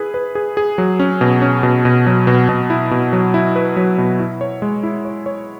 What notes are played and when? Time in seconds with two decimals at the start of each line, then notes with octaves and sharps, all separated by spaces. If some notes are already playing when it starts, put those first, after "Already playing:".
Already playing: E4 G#4 B4
0.14 B4
0.35 G#4
0.57 G#4
0.78 F#3
1.00 C#4
1.21 B2
1.42 C#4
1.63 B2
1.85 B2
2.07 F#3
2.27 B2
2.49 B2
2.70 E4
2.91 B2
3.13 F#3
3.34 E4
3.56 B4
3.77 F#3
3.98 B2
4.20 E4
4.41 C#5
4.62 G#3
4.83 E4
5.05 C#5
5.26 C#5